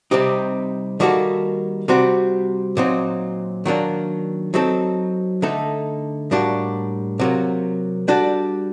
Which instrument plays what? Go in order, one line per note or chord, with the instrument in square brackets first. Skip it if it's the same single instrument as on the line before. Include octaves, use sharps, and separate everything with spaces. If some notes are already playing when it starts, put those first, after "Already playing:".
[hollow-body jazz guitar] C3 G3 C4 D#4 G4
D#3 G3 A#3 F#4 A4
C3 G3 C4 F#4
A#2 F#3 C4 D#4
D#3 F#3 A#3 D4
F#3 C4 D#4 A4
D3 A3 D#4 A4
A2 G3 A#3 D4 F#4
C3 F#3 A#3
G3 D4 F#4 A4